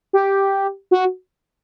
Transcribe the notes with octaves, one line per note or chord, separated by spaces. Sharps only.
G4
F#4